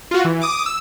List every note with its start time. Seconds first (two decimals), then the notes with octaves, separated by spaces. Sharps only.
0.11 F4 F#4
0.25 E3
0.41 D6 D#6
0.66 E6